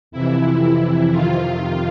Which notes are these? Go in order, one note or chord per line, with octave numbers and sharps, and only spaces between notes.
F2 C3 E3 E4
F2 C3 D#3 F4